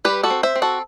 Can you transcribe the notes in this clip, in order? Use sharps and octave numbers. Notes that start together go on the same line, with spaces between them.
G3 G4 B4
F#4 A4
C4
C5 E5
C4
F#4 A4